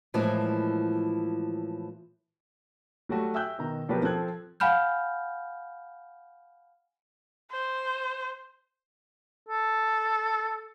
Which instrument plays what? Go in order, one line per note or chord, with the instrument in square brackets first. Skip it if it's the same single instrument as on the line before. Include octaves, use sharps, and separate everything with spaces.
[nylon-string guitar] A2 E3 F3 G#3 A#3 E4
[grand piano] F#3 G3 A3 F#4
E5 G5 G#5 E6 F#6 G6
B2 D#3 A#5
B2 F3 F#3 G4 A#4 B4
F3 C4 A4 F#6 G#6
[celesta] F5 F#5 G#5 B5 F6 G6
[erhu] C5
[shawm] A4